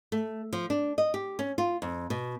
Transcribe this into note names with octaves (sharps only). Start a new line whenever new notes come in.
A3
F3
D4
D#5
G4
C#4
F4
F2
B2